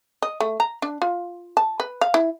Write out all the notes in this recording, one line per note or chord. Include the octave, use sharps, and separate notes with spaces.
D#5
A3
A#5
D4
F4
A5
B4
F5
E4